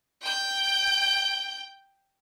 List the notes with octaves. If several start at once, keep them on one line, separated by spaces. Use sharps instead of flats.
G5 G6